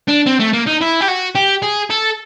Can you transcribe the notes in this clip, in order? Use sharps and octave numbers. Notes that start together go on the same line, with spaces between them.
D4
C4
A3
A#3
D#4
E4
G4
F#4
G4
G#4
A4